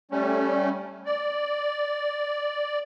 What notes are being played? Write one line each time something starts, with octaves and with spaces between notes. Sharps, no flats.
G3 A3 C#4
D5